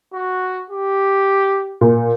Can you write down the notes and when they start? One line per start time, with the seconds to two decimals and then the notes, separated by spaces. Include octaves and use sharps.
0.13 F#4
0.70 G4
1.81 A#2